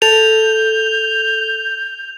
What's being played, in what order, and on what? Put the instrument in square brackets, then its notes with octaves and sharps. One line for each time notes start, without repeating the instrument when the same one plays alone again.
[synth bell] A4 [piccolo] G6 [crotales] F7